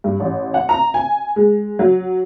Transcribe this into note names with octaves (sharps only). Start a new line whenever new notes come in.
G2
A1
F#5
A#5
G#5
G#3
F#3